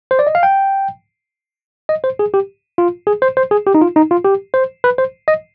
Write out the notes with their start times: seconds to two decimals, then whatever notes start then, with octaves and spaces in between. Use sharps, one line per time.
0.11 C5
0.19 D5
0.27 D#5
0.35 F5
0.43 G5
1.89 D#5
2.04 C5
2.19 G#4
2.34 G4
2.78 F4
3.07 G#4
3.22 C5
3.37 C5
3.51 G#4
3.67 G4
3.75 D#4
3.81 F4
3.96 D#4
4.11 F4
4.25 G4
4.54 C5
4.84 B4
4.98 C5
5.28 D#5